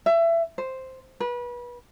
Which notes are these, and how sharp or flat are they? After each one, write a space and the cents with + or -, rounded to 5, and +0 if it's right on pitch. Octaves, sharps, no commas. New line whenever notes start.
E5 +25
C5 +0
B4 -30